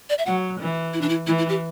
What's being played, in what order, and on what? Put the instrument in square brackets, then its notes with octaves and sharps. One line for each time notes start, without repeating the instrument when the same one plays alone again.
[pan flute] D5
E5
[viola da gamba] F#3 [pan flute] F#5
[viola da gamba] E3
[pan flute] E4
D4
E4
[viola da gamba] E3 [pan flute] E4
[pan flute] E4
G4